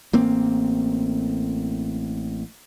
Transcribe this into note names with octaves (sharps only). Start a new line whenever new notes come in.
A1 A#3 C4